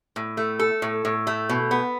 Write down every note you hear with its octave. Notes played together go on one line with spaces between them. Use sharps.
A2
A3
A4
A2
A2
A3
B2
B3